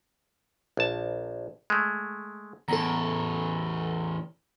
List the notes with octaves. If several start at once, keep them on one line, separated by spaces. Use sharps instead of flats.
A#1 A5
G#3 A3
E2 A2 A4 A#5